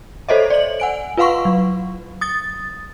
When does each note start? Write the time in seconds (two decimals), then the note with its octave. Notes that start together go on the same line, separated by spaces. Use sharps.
0.29 A4 C5 C#5 D#5 E5
0.50 D5 F#7
0.80 F#5 G#5 D7
1.17 F4 B4 F5 F#5 C6 C#6
1.45 F#3
2.21 D#6 A6